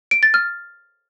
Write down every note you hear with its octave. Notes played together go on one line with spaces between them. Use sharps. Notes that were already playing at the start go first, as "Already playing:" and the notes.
D7
A6
F6